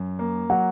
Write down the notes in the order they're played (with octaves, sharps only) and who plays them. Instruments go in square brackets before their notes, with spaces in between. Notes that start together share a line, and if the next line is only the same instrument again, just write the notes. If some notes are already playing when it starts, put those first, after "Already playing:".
Already playing: [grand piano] F#2
A#3
[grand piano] F#3 [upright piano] F#5